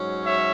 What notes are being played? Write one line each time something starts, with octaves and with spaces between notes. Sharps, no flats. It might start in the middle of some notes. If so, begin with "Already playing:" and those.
Already playing: G#2 F#3 C#4
C#5 E5